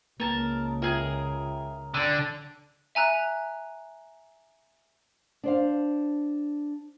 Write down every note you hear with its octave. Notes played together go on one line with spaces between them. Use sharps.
C#2 C#3 A#3 A#4 A5
F4 G#4 A#4 E5 G5
D3 D4 G5
E5 G#5 A#5 F#6
D4 C5 F5